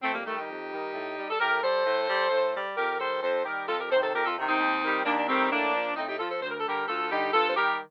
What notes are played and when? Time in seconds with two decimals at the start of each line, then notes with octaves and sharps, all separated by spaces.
0.03 F2 A3 C4
0.14 G3 A#3
0.25 D#3 G3 A3
0.37 D#4 G4
0.49 F2
0.71 D#3 G3
0.94 A2
1.17 G3
1.30 A4
1.40 A2 G4 A#4
1.62 G3 A4 C5
1.86 A2
2.08 G3
2.31 A2
2.55 G3
2.77 F2 G4 A#4
2.99 D#3 G3 A4 C5
3.22 F2 A4 C5
3.45 D#3 G3 G4 A#4
3.68 F2 F4 A4
3.79 G4 A#4
3.91 C3 A4 C5
3.95 D#3
4.02 A4 C5
4.14 F2 G4 A#4
4.25 F4 A4
4.37 C3 D#3
4.48 C4 D#4
4.59 D#2
4.82 D#3 G3
5.05 D#2 A#3 D4
5.18 D4
5.28 D#3 G3 A3 C4
5.40 D#4
5.51 A2 A#3 D4
5.74 F3
5.96 A2 C4 D#4
6.08 D#4 G4
6.19 F3 F4 A4
6.30 A4 C5
6.42 D2 C5
6.50 A#4
6.59 A4
6.66 D3 G3 G4 A#4
6.87 D2 F4 A4
7.10 D3 G3 D#4 G4
7.33 G2 F4 A4
7.48 C5
7.56 D#3 G3 G4 A#4